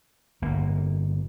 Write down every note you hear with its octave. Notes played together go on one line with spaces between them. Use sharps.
G1 A#3